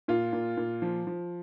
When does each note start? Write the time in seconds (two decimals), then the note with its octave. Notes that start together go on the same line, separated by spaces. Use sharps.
0.08 A#2 F4
0.33 A#2
0.57 A#2
0.82 F3
1.07 F3